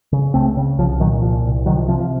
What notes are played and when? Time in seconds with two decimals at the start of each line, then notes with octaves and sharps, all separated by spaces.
0.12 C#3
0.34 C#2 A3 C4
0.57 C#3
0.78 C2 F3
1.00 A#2 D#3 F#3
1.22 C2 F3
1.44 C2
1.66 C3 D#3 F#3
1.77 F3
1.88 C3 F3
2.00 F3